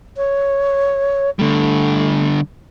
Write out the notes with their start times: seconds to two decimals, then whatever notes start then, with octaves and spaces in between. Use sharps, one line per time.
0.17 C#5
1.39 D3 G3 A3